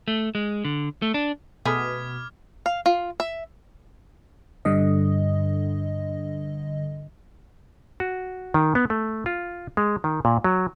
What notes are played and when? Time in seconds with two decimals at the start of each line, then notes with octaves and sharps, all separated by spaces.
0.08 A3
0.35 G#3
0.65 D3
1.02 A3
1.14 D4
1.65 B2 A3 G#4 B5 D6 D#6 F6 G#6
2.66 F5
2.86 F4
3.20 E5
4.65 G2 D3 D#5
8.00 F#4
8.54 D#3
8.75 B3
8.90 A3
9.26 F4
9.77 G#3
10.04 D#3
10.25 A#2
10.44 F#3